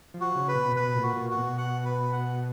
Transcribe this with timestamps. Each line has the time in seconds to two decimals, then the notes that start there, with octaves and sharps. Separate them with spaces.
0.14 F3
0.21 F#4
0.35 C#3
0.48 B4
0.55 B2
0.76 B2 B4
0.96 A#2
1.03 F#4
1.17 A#2
1.30 F#4
1.37 B2
1.58 F#5
1.85 B4
2.13 F#5